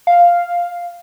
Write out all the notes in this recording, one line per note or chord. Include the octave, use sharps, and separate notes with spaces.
F5